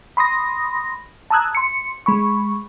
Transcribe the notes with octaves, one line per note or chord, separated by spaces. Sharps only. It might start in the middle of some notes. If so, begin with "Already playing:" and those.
B5 C6 D#6 A#6
A5 A#5 D#6 E6 F#6 G#6
C6 C#7
G#3 B5 C#6